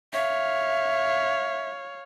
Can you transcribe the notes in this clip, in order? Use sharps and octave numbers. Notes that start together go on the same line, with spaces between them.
C#5 E5 F5